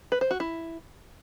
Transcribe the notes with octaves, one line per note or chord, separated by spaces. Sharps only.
B4
C5
F#4
E4